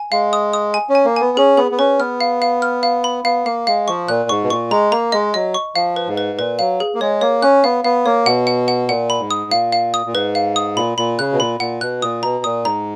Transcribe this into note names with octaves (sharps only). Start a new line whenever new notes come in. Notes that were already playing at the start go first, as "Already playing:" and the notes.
Already playing: G#5
G#3 F5
D#6
D#6
G#5
C#4
G#5
A#3
B3 G#5
C#4 G#4
B3 G#4
B3
C#4 B4
B3 F6
F5
F5
F6
F5
B5
B3 F5
A#3 F5
G#3 F5
F3 C#6
A#2 F#6
G#2 C#6
B2
A#2 C#6
G#3 A#5
A#3 A#5
G#3 D#5
F#3 D#5
C#6
F3 F5
B4
G#2
B4
A#2 B4
F#3 F5
G#4
A#3
G#3 C#5
A#3 C#5
C#4 F#6
B3 F5
B3 F5
A#3 C#5
B2 F#5
F#5
F#5
A#2 F#5
B5
G#2
D#6
A#2 F5
F5
D#6
A#2
G#2 B4
F5
D#6
A#2 B5
A#2 B5
C#3 F#6
B2
A#2 B5
A#2 F#5
B2 F#6
A#2 D#6
B2 A#5
A#2 D#6
G#2 A#5